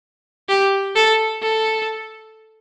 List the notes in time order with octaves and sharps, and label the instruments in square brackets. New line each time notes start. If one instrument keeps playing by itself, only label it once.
[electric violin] G4
A4
A4